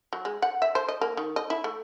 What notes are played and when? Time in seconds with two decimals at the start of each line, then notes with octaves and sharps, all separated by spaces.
0.13 F#3
0.25 G#3
0.42 F#5
0.62 E5
0.75 C5
0.88 D#5
1.01 A#3
1.17 D#3
1.36 D#5
1.50 E4
1.64 A3